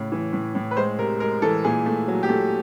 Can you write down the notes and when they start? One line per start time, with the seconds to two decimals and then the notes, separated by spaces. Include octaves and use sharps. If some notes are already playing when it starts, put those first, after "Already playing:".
Already playing: A2 C#3
0.12 E3
0.33 A2
0.55 A2
0.71 B4
0.77 G#3 C5
0.98 C3 A#4
1.20 G#3 A#4
1.42 E3 A4
1.64 A#2 G#4
1.86 A3
2.08 F#3
2.23 G4
2.29 A3